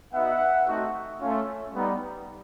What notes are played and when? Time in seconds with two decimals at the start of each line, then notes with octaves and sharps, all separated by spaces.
0.14 B3 D#4 F#4 E5 F#5
0.67 A3 C4 D#4 F#4
1.21 A3 C#4 F4
1.74 G3 B3 D#4